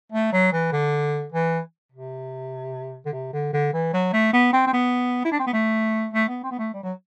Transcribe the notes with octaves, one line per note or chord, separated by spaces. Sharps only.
A3
F#3
E3
D3
E3
C3
D3
C3
D3
D3
E3
F#3
A3
B3
C4
C4
B3
E4
D4
C4
B3
A3
A3
B3
C4
B3
A3
G3
F#3